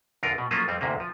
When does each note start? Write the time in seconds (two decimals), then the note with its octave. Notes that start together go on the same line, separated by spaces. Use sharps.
0.23 E2 D3 F4 A#4
0.38 B2
0.51 F3 F#3 A3 A#3 C#4 F4
0.68 F2 G3 C4
0.81 D2 G#2 C3 A#3
1.00 F3